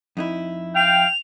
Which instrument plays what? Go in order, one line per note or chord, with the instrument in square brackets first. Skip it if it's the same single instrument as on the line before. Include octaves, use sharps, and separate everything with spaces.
[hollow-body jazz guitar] F2 D#4 E4
[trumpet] F5 [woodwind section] G5 [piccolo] F7